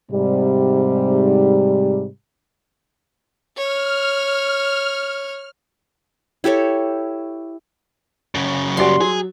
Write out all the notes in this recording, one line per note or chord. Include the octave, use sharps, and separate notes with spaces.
G#2 C3 G3
C#5 F6
E4 G4 A4 C#5
F#2 C#3
G3 F#4 D5 C6
F#3 G#4